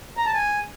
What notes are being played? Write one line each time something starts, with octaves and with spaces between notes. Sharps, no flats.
A#5
A5
G#5